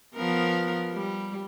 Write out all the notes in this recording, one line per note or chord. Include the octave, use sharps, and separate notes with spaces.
F3 B3 A#4
G3